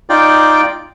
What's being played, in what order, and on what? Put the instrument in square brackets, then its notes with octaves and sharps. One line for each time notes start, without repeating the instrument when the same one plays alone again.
[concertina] D#4 F4 D5 G5